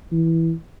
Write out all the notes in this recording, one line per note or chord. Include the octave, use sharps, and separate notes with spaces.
E3